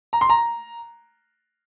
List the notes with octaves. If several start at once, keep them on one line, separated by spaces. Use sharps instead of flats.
A#5
C6
A#5